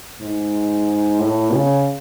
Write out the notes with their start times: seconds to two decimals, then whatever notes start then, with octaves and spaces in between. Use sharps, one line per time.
0.21 G#2
1.19 A2
1.52 C#3